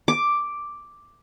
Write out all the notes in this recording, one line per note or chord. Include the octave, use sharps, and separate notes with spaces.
D6